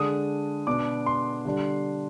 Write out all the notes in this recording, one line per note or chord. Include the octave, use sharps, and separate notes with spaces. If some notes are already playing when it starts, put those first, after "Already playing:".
Already playing: D3 G#3 D4 D#6
B2 B3 D4 D6
C6
D3 G3 D4